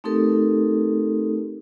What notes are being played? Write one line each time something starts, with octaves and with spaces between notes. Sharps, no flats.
A3 C4 D#4 G4 A4 A#4